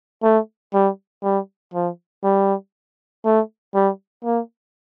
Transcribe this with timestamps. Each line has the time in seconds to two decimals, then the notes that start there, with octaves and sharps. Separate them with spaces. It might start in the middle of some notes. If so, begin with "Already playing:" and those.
0.23 A3
0.74 G3
1.24 G3
1.74 F3
2.24 G3
3.25 A3
3.75 G3
4.25 A#3